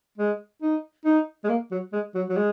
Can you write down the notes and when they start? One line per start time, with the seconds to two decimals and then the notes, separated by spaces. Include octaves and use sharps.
0.18 G#3
0.62 D#4
1.05 D#4
1.44 G#3
1.49 A#3
1.71 F#3
1.93 G#3
2.15 F#3
2.29 F#3
2.37 G#3